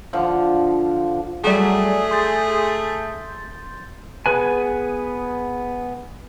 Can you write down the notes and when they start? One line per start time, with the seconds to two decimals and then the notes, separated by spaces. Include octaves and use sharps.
0.13 D3 F3
1.44 F#3 G3 A3 G#4 D5
2.11 C6 G6 A6
4.26 B3 G#4 B4 G#5